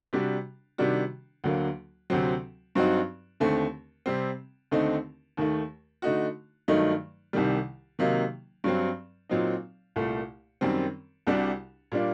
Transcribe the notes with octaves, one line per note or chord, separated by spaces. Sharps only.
C3 G3 D4 F#4
C3 D#3 G3 D4 F#4
D2 D3 F#3 A#3
D2 C3 F#3 C4
G2 F#3 C4 D#4 F#4
D#2 D3 A3 C4
C3 G3 C4
D#2 D3 A3 C4 D#4
D#2 D#3 A3
D3 A3 D#4 F#4
G2 D#3 F#3 A3 D#4
C2 C3 D#3 G3
C3 D#3 F#3 A#3 D#4
G2 F#3 C4
A#2 F#3 C4 D#4
C2 A#2 A3
F#2 D#3 G3 C4
C2 C3 G3 D4 F#4
A#2 G3 A#3 D4